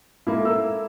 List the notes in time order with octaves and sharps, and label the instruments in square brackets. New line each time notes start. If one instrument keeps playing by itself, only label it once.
[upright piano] G#2 A#3 [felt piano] E4 A4
[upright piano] A#4 E6